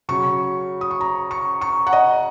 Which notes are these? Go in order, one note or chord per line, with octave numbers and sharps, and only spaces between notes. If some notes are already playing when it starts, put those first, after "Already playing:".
C#3 F#3 C#6
D#6
C#6
A#5
C#6
C#6
F#5
D#5